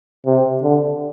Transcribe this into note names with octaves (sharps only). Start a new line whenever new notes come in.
C3
D3